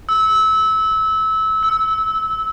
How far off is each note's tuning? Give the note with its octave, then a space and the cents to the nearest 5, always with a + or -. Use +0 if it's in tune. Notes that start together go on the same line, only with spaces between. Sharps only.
E6 -25
E6 -5